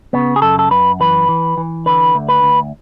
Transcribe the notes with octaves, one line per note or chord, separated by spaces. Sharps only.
C#3 B3
G#4
F#2 A4
A4
F#2 B4
E3 B4
E3
E3
D3 B4
D2
B4
D2